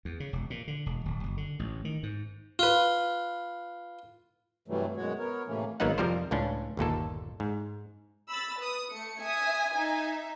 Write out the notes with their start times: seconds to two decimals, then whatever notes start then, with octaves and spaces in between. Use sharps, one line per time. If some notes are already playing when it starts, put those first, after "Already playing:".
0.05 E2
0.20 C#3
0.33 E1
0.50 A#2
0.68 D3
0.86 E1
1.05 D1
1.23 F#1
1.37 D3
1.59 A1
1.85 D#3
2.03 G#2
2.59 F4 B4
4.68 G2 C3 E3 F#3 G3 A3
4.97 F#2 B2 G#3 F#4 C#5
5.19 B3 A#4 C#5
5.47 A2 C3 E3 A3 A#3 C#4
5.80 G#1 F#3 A#3 B3 D#4 F#5
5.98 F2 C3 F3 G3 A#4 C5
6.31 C#2 A2 C#4 D4
6.77 G1 D#2 A#2 A4
7.40 G#2
8.29 B5 E6 A6
8.59 B4 D#6
8.92 A3 C#7
9.22 E5 G#5 D#6
9.73 D#4 E5